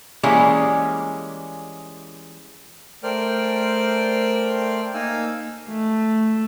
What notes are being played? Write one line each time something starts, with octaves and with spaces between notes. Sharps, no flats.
E3 G3 G#3 A#3 C#4
A3 A#4 C5 D5 G5 F6
A#3 D#4 F5 G#5 E6
A3